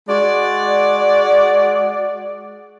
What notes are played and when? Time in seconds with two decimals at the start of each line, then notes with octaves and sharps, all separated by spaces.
0.08 G#3 F#4 D5